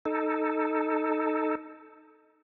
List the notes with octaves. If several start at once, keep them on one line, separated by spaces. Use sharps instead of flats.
D#4 A4